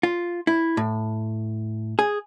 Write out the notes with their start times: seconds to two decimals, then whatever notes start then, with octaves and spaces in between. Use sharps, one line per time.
0.03 F4
0.47 E4
0.77 A2
1.99 G#4